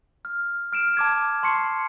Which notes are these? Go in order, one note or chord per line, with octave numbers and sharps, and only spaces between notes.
F6
F6 D7 E7
A5 D6 G#6
A5 C6 C#6 C7 C#7